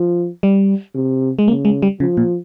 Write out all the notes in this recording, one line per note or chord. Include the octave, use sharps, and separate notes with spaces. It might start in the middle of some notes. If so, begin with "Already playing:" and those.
Already playing: F3
G3
C3
G#3
C#3 A#3
G#3
G3
C#3 F3
A#2